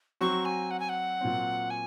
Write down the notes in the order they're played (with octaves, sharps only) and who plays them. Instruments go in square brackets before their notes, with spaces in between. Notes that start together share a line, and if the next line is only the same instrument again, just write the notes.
[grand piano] F#3 C4 F#4 [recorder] C#6
[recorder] G#5
F#5
G#5
F#5
[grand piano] A#2 F#3 C4
[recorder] G#5